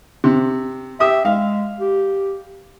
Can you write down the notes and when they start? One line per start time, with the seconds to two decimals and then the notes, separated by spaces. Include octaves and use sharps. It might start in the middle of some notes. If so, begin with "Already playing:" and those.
0.24 C3
1.00 G4 E5 D#6
1.25 G#3 F5
1.80 G4